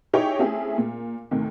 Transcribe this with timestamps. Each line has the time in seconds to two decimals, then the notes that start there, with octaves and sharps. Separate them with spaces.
0.13 D#4 E4 G4 G#4 C#5 G5
0.39 A3 C4 C#4 E4 G4 G#4
0.78 A#2
1.31 D2 A2 C3 D#3